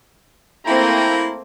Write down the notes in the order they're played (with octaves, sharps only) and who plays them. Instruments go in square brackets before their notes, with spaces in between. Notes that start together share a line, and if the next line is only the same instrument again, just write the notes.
[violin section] A3 A#3 C4 [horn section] E4 G5 A#5